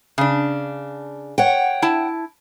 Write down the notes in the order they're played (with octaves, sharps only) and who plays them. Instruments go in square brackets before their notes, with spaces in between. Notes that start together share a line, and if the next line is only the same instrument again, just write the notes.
[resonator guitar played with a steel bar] C#3 D4
[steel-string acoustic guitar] C#5 F#5 G5
[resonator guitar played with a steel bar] E4 A5